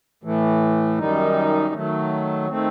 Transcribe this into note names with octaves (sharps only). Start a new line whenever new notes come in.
A2 E3 A3
F#2 D#3 G3 D#4
D#3 F#3 A3
D#3 A3 C4